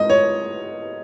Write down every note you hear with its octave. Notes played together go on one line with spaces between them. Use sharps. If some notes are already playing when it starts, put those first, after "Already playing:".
Already playing: G#2 D#5
C#5